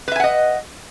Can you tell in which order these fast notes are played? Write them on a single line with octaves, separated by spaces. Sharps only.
B4 E5 G#5 F#5 D#5